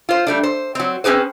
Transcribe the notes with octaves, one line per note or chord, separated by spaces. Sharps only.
F4 C5
G3 A3 D4
C5
F#3 C4
C4 C#4 G#4 B4 C5